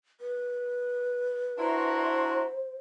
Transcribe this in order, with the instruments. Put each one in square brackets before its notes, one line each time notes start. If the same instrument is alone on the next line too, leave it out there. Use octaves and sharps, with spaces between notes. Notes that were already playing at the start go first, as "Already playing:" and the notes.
[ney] B4
[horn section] D4 E4 F#4 [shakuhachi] C5 [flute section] E5 A#5 C6